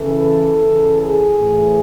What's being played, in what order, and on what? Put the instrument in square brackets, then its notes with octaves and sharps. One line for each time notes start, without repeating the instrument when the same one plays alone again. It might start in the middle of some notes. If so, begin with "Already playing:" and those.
Already playing: [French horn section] C#3 E3 A4
C#3 E3
G#4
A2 E3